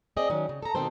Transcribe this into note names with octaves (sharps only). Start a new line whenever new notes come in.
C4 G#4 D5 D#5
D#3 F#3 C#4
C#3
A4 A#5
D2 B2 D#3 C4 A4 C5